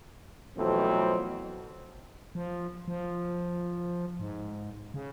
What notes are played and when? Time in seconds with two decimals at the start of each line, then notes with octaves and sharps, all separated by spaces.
0.57 F2 B2 E3 F#3 A3 C4
2.35 F3
2.88 F3
4.19 G#2
4.94 C#3